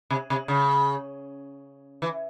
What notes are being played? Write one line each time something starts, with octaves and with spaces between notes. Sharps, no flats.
C3
C3
C#3
E3